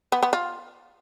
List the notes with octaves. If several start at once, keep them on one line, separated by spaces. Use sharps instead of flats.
B3
B3
F4